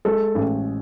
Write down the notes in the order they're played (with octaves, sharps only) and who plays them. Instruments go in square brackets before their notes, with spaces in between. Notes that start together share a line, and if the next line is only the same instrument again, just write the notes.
[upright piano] G#3 [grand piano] A4
[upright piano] A1